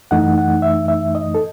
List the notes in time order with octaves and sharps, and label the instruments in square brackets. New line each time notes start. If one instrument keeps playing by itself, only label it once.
[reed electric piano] F#2 E3 A3 D#4 F#5
F#5
E5
E5
D#5
A4